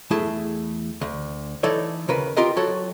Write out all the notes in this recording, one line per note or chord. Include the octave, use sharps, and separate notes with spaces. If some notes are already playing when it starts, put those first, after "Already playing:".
E2 A3 E4 G#4 A5
D2
E3 D#4 A4 C#5 D5
D#2 C#3 A#4 B4
F4 G4 A#4 D#5
F#3 F#4 A4 C#5